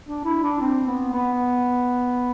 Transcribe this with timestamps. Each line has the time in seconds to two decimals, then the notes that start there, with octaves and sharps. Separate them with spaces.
0.07 D4
0.25 E4
0.43 D4
0.61 C4
0.87 B3
1.13 B3